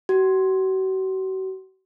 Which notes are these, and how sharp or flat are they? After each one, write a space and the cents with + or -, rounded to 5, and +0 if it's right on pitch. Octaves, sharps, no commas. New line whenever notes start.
F#4 +40